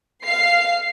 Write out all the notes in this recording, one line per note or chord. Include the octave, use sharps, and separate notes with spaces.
F5 C7